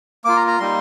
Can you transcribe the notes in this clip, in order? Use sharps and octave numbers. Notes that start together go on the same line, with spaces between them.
A#3 F4 D6
A#5
A#5
G3 A#3 D#4 C6